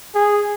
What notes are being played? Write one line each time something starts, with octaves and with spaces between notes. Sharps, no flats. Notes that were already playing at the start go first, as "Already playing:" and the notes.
G#4